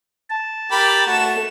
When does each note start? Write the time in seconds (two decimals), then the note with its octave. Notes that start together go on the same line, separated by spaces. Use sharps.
0.30 A5
0.71 G4 A#4 B5 A6
1.07 A3 F#4 E7